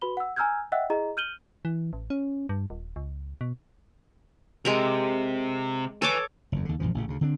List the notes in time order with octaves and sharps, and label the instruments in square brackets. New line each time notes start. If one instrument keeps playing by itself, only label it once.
[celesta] F#4 B4 B5 G7
F#5 E6
G#5 A#5 E6 F6 G6 G#6
D#5 E5 F#5 G5 E6 F#6
E4 G#4 D#5 A#5
F6 G6 D#7 F#7 G7
[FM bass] E3
A1
C#4
G2
D#1
C#2
B2
[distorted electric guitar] C3 [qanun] G#3 G4 A#4
[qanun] A4 C#5 D6 [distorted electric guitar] B4 G#5
[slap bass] F#1 E2
D#2 D3
A#1 F#2 E3 F3
A1 A#2 C#3
D2 C#3
D3 C4 D4